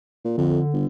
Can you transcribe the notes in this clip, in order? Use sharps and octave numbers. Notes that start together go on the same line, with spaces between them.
A#2
F2 D3
G1